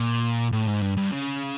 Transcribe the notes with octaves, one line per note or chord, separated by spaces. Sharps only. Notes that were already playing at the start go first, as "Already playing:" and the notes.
Already playing: A#2
A2
G#2
G2
G2
C#3